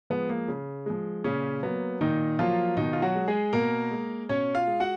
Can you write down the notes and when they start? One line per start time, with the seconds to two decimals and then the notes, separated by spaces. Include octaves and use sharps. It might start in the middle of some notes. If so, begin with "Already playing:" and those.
0.10 F3 G#3 B3
0.30 A#3
0.48 C#3
0.86 F3 G#3
1.24 A#2 C#3 C#4
1.63 F#3 A#3 B3
2.01 A#2 D#3 D#4
2.39 F3 F#3 A#3 F4
2.77 B2 D#3 D#4
2.93 F4
3.02 F#3 F#4
3.15 G#3
3.28 G#3 G#4
3.53 B2 A#3 A#4
3.91 G#3
4.29 B2 C#4 C#5
4.54 F4 F5
4.67 G#3
4.80 F#4 F#5